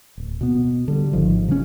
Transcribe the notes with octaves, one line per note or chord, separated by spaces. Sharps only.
D1
B2 B3
D3 G3
G#1 D#3 F3
C#3 F#3 A3 C#4